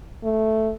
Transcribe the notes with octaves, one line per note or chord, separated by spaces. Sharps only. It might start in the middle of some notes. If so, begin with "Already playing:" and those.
A3